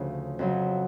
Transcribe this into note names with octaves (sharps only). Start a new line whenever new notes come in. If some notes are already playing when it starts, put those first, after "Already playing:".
Already playing: D2 C#3 F3
F2 C#3 F#3